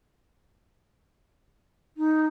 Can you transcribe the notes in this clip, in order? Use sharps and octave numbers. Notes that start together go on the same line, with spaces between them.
D#4